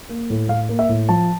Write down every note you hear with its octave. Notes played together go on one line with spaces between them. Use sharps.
A#3
A2
A2 F5
A#3
E5
A2
F3 A5